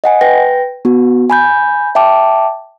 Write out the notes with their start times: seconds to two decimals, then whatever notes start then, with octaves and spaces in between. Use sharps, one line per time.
0.04 D#5 F#5 G#5
0.21 B4 G5 A#6
0.85 B3 F#4
1.30 G#5 B5 G6
1.95 E5 G5 A5 D6